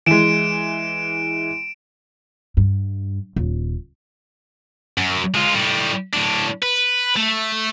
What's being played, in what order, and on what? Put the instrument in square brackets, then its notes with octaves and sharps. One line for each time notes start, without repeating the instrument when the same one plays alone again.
[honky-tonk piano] E3 G#3 [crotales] D7 E7
[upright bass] G2
D#1
[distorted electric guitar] F#2
G#3 F4
A2 G3
A2 D4
B4
A3